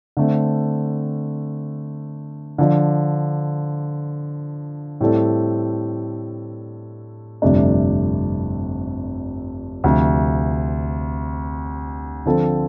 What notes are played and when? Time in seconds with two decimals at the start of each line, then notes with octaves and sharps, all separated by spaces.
0.17 D3 A3 C4
2.58 D3 F3 D4
5.01 A2 G3 C4 A4 D5
7.42 G1 F2 C3 A3 D4
9.84 D2 C3 F3
12.26 D3 F3 C4 A4